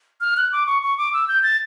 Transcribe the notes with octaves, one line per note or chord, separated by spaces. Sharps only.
F6
F#6
D6
C#6
C#6
D6
E6
G6
A6